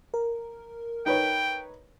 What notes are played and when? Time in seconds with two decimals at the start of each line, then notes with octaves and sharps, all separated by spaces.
0.14 A#4
1.06 D#4 B4 C#5 G5